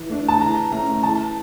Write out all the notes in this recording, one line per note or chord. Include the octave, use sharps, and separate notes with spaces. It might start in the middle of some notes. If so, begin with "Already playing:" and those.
Already playing: E3
A3 D4
A5
E3 A#5
A3 C#4 A#5
E3 A5